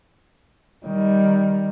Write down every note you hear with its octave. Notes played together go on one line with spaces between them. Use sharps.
D#3 G3